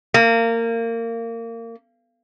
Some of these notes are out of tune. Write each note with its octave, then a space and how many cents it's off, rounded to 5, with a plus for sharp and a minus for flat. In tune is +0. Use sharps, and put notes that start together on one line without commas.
A#3 -25